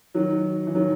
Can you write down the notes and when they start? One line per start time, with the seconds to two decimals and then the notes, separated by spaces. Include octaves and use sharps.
0.14 D#3 F#3
0.67 E3
0.75 D#3 F#3